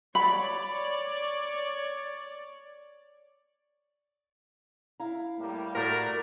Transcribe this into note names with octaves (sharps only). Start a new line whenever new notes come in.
C#5 D5 B5
E4 F5 A#5
A2 G3 A#3
A2 A3 F#4 A#4 D5